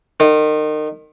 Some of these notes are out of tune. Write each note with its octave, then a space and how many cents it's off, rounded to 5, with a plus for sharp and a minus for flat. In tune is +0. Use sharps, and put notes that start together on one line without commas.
D#3 -30